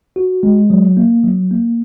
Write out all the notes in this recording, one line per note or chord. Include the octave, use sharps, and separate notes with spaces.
F#4
G#3
F#3
A#3
F#3
A#3